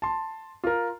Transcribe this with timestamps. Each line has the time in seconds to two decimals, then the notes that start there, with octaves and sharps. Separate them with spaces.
0.02 A5 C6
0.64 F4 A#4